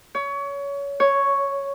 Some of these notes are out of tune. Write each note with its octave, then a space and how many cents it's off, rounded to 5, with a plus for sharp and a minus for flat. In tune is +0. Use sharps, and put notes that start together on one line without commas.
C#5 +25
C#5 +0